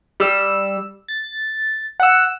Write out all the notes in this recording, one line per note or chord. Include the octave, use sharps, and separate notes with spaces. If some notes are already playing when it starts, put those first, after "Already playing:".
G3 E6
A6
F#5 E6